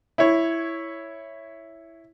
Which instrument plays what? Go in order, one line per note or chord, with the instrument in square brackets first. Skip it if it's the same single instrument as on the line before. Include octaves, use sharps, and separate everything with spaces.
[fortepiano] E4 C#5